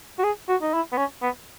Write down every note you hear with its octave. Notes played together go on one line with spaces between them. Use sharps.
F#4
G#4
F#4
D#4
E4
B3
C#4
B3